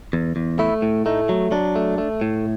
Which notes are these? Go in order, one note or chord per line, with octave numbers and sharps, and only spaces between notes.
E2
E2
A3 E4
A2
A3 D#4
F#3
F#3 D4
A3
A3
A2